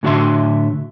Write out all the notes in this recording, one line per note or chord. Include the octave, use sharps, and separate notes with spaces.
A2 D3 F#4 C#5 E5 C6